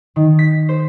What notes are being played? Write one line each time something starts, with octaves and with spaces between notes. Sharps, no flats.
D#3
B6
C5